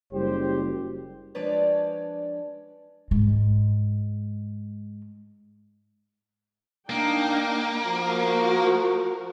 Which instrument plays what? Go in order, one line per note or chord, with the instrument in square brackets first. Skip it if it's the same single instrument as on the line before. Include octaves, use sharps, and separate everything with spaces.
[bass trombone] F#1 [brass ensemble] G3 G4 C5
[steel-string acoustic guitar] F3 G#3 D4 B4 C#5 D5
[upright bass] G#2 G#3
[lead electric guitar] A#3 [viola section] D4 D#4 G5
[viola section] F3 F#4 A#4